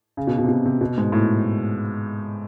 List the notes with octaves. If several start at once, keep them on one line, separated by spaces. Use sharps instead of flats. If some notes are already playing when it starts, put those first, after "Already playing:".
C#3
B2
B2
C3
B2
C3
B2
G#2
A2